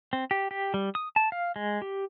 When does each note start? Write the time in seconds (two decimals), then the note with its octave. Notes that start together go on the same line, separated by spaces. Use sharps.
0.13 C4
0.31 G4
0.51 G4
0.74 G3
0.95 D#6
1.16 A5
1.32 F5
1.56 G#3
1.82 G4